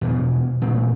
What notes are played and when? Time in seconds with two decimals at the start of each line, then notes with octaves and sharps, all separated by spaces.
0.01 E2 B2 E3 F3
0.62 A1 A#2 C4